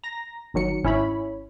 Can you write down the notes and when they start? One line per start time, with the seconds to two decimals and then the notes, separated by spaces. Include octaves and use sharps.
0.04 A#5 A#6
0.54 G1 D#3 F#3 C#7
0.83 G#1 C#4 E4 C#5 B5